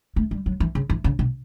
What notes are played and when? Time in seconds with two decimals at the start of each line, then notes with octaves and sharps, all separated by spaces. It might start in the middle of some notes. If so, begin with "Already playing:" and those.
0.16 A3
0.31 G3
0.46 F#3
0.60 E3
0.75 C#3
0.90 E3
1.04 C#3
1.19 B2